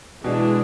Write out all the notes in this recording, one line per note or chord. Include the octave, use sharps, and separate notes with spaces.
B2 E3 G#3 D4 G#4